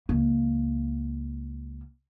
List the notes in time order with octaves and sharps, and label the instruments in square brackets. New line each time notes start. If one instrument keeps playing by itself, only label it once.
[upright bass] C#2 A#3